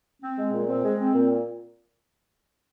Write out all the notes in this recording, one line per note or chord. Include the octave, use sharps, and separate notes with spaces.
C4
G#3
A#2
C4
G#3
C4
A#2